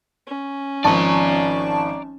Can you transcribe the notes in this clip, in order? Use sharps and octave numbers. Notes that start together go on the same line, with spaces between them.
C#4
G#1 F3 D5 A5 A#5 C#6